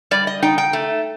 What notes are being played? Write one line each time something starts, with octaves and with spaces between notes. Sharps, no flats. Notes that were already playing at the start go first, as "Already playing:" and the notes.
G3 D5
D#5
D#4 G5
G5
A3